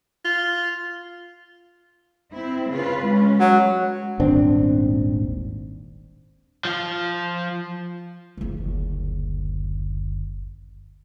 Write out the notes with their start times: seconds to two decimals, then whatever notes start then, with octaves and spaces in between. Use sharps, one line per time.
0.25 F4
2.34 C4 E4
2.72 C#3 F4 B4
3.07 G#3 C#4
3.39 F#3
4.20 D#1 G#1 C4 D4
6.65 F3 F4
8.37 F#1 D2